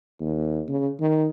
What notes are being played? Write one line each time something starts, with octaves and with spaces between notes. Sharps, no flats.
D#2
C#3
D#3